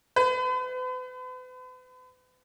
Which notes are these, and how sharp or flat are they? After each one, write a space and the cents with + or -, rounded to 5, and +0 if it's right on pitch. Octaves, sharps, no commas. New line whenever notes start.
B4 +45